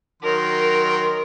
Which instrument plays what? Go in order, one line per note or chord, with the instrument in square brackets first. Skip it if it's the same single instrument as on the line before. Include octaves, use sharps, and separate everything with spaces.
[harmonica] D#3 F#3 C6 [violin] A#4